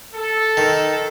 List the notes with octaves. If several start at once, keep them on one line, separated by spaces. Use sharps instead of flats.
A4
D#3